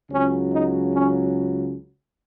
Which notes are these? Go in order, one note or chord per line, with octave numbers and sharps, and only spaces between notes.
C#2 C#3 F#3 C#4
D#4
C#4